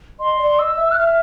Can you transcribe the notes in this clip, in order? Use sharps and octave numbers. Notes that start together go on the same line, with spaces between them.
D#5 C6
D5
D#5 E6
E5
F#6
E5 F6